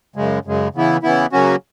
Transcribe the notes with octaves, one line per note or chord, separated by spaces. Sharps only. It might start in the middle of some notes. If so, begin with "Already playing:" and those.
F#2 C#3 G#3
F#2 C#3 G#3
C#3 E3 B3 E4
C#3 E3 B3 E4
C#3 F#3 A#3 C#4 F#4